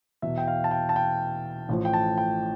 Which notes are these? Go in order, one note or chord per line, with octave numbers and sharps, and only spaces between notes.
E2 B2 E5
G5
F5
A5
G5
A5
G5
A1 A2 F3
G5
A5
G5